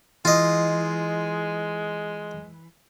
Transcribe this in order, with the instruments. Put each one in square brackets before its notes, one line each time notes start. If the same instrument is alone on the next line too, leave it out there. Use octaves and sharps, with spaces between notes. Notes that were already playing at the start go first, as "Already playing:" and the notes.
[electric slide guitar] E3 [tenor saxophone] G#3 [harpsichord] F4 D#5